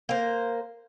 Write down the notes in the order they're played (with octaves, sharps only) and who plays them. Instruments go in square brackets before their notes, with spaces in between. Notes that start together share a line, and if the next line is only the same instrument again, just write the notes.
[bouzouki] A#3 C5